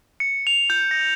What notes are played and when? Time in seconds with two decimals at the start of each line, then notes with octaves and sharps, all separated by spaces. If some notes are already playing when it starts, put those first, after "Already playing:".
0.20 C#7
0.47 F7
0.70 G6
0.91 A#6